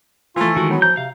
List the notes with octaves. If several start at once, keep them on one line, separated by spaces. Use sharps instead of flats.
E3 F3 A3 F4
D#3 G#3 F#4
F#3 B3
F3 A#5 G6
C3 F5